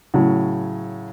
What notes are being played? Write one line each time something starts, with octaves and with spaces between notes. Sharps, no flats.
A2 C#3 F#3